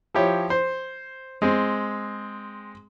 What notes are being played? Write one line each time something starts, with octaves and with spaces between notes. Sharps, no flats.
F3 E4 G4 C#5
C5
G#3 C4